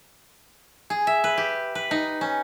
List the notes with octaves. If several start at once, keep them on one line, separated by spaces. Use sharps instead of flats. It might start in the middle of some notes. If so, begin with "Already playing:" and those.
G#4
E5
B4
G4
B4
D#4
C#4